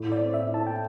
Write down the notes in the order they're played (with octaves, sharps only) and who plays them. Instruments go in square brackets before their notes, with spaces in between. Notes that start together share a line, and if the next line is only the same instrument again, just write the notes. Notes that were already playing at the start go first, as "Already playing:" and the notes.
Already playing: [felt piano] A2
[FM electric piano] D5
[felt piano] C4
[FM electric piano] E5
[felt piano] E4
[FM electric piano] A5
G5